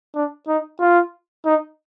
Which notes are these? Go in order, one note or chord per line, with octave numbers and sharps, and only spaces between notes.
D4
D#4
F4
D#4